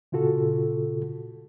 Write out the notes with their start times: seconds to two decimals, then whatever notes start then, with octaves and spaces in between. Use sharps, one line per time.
0.12 A#2 C#3 F4 F#4 A4